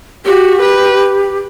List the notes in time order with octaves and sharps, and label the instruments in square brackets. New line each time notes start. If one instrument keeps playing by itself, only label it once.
[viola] F#4 [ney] G4
[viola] B4